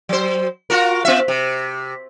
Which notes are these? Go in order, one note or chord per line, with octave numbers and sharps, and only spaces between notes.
F#3 C5
F4 F#4 A#4
B3 F4 E5
C3